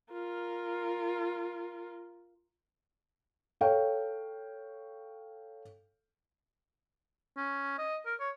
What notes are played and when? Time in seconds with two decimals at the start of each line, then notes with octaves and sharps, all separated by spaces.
0.13 F4 A#4
3.61 A4 C#5 F5 G5
7.37 C#4
7.78 D#5
8.06 A#4
8.20 C#5